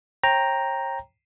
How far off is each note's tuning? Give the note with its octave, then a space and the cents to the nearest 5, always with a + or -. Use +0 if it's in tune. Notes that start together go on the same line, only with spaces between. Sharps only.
C#5 -40 G5 +5 A#5 +0